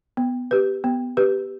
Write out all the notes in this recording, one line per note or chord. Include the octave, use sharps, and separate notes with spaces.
B3
G4 B4
B3
G4 B4